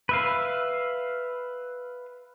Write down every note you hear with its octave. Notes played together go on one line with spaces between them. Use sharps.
B4 E5 F5